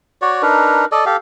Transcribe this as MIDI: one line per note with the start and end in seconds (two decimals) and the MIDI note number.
0.22 0.42 66
0.22 0.42 73
0.22 0.42 74
0.42 0.85 62
0.42 0.85 63
0.42 0.85 70
0.42 0.85 71
0.92 1.05 69
0.92 1.05 74
0.92 1.05 75
1.06 1.17 67
1.06 1.17 69
1.06 1.17 77